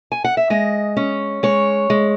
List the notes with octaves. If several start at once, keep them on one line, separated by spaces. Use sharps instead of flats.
G#5
F#5
E5
G#3 D#5
C#4
G#3 C#5
G#3